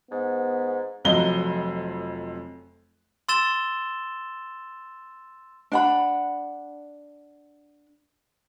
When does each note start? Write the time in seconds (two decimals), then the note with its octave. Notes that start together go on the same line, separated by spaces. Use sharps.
0.11 G#2 B3
1.05 F1 F2 F#3 D#5 G7
3.29 C6 E6 A6 E7 G7
5.72 D4 F#5 B5